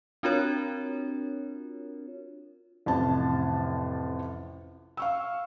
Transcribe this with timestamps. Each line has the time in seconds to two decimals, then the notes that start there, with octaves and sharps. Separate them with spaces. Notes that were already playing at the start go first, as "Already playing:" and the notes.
0.23 C4 D4 F4 F#4 A#4 C#5
2.86 A1 F2 C3 A5
4.97 F5 C#6 E6